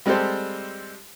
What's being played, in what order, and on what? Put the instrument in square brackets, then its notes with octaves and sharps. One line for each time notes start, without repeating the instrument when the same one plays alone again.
[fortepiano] G3 G#3 C4 G4 A4 C5